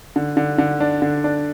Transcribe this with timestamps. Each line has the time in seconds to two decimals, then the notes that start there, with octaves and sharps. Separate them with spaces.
0.16 D3
0.37 D3
0.58 D3
0.80 D4
1.02 D3
1.24 D4